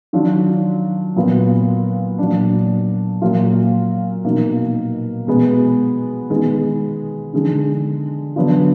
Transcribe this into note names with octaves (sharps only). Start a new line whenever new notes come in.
D#3 F#3 D4 F4
A#2 F#3 B3 F4
A#2 F#3 D4
A#2 F#3 A#3 F4
B2 A#3 D#4
B2 G#3 B3
D#3 G#3 B3
D3 G#3 D#4
D3 F#3 B3 D4 F4